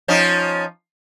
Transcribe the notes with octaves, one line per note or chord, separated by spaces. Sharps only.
F3 C#4 D#4